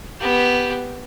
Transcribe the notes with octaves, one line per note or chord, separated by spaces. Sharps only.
B3 G4